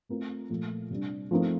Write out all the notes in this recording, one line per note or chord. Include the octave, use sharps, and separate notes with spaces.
A3 C4 F4 A#4
A#2 F3 A3
C3 G3 D4
F3 A3 C4 D#4 A#4